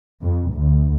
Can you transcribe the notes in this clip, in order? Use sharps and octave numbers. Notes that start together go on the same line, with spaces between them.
F2
D2